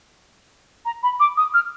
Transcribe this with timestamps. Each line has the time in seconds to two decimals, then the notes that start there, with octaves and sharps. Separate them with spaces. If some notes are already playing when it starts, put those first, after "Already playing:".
0.85 A#5
1.03 B5
1.20 D6
1.37 D#6
1.54 F6